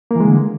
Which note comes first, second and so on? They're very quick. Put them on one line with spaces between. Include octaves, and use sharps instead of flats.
A#3 E3 G#3 D3